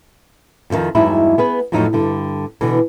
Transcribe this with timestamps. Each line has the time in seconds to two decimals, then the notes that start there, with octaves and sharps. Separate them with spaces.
0.70 F2 B2 D3 D#3 F3
0.95 E2 G2 F#3 G#3 D#4 E4
1.38 B3 G#4 B4
1.72 F2 A2 F3 F#3 D#4
1.93 G2 D3 G3
2.61 B2 D3 E3